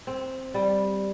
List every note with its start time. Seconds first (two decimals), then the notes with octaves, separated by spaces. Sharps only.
0.07 C4
0.54 G3